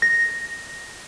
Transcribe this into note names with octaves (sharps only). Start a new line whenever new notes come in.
A#6